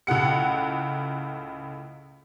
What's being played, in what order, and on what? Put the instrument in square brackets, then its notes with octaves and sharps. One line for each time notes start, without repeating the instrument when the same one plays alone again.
[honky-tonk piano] C#2 A2 F#5 C#7